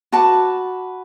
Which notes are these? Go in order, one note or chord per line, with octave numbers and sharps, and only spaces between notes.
F#4 B4 A5 D6